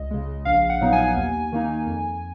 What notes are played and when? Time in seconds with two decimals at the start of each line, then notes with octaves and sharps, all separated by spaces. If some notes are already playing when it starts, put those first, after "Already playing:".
Already playing: C#2 D#5
0.11 C#3 G#3
0.45 A#1 F5
0.69 F#5
0.81 A#2 F#3 B3 D#4
0.93 G#5
1.16 D#2
1.52 D#3 A#3 D#4
1.87 F2